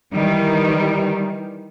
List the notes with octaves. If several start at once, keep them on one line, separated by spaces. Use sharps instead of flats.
D#3 E3 G3